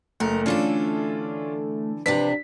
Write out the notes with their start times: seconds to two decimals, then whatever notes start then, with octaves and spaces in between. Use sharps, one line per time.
0.20 F#1 A3 A#4
0.46 D3 E3 C#4 D4 F4 A4
2.06 C3 F3 D4 B4 B6